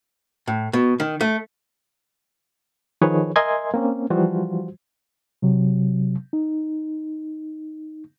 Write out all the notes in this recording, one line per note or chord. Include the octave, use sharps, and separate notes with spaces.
A2
B2
D#3
A3
D#3 F3 G#4 B4 C#5
A#4 D#5 E5 G#5 C6 G#6
A#3 C4 C#4
E3 F3 G3 F4 F#4 C5
C3 F#3
D#4